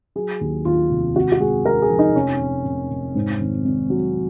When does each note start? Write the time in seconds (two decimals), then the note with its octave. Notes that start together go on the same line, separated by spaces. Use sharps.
0.16 F#3 G#4
0.41 D#2
0.65 D#2 F4
0.90 F1
1.15 G#1 F#4
1.32 F#4
1.40 G#3 G#4
1.65 G#3 A#4
1.82 G#4
1.90 F3
1.99 D#4
2.15 F1 C#4
2.41 F1
2.65 F1
2.91 F1
3.15 G#2
3.40 G#1
3.65 G#1
3.90 F#3